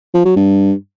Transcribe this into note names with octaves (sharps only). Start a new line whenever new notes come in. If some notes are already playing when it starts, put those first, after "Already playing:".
F3
F#3
G2